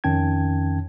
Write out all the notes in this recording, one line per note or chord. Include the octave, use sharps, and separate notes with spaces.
F2 D#3 C#4 G5 A5 G#6